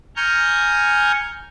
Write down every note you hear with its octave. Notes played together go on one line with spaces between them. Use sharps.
G#5 A#5 C#6 F6 G6